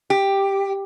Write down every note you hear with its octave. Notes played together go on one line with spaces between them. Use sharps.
G4